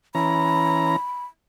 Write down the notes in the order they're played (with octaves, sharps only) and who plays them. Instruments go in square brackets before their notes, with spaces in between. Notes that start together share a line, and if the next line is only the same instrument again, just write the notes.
[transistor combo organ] E3 C#4 A#5 [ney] B5